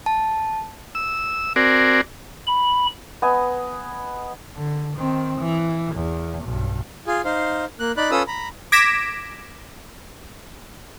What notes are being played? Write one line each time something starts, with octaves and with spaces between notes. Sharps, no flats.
A5
E6
C4 F#4 A#4 D5 G#5
B5
B3 D#5 G#5
D3
D#3 C4
E3
E2
B1 G2
F4 G#4
D#4 C5 F5
A#3 F#6
D#4 D5 B5 F#6
C#4 F4 A4 B4 D#6 E6
A#5 B5
D6 G#6 A#6 B6 D7 E7